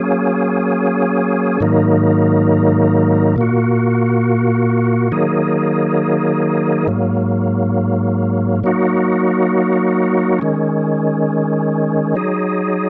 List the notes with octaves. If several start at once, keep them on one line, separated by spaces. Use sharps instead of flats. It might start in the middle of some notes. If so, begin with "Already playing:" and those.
Already playing: F#3 A#3 C#4 G#4
G#2 D#3 F#3 A#3 D#4
A#2 A#3 F#4
D#3 F#3 A#3 D#4 G#4
G#2 F#3 A#3
F#3 A#3 D#4 F#4
D#3 G#3 C#4
F#3 D#4 G#4